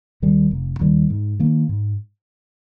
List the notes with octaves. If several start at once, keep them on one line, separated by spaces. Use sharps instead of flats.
D#2 D#3 G3
F1
D#2 D#3 G3
G#2
D#3 A#3
G#2